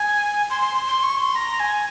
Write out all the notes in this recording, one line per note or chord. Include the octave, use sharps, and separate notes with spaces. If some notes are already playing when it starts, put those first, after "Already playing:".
Already playing: G#5
C6
C6
C6
C6
C#6
C6
A#5
G#5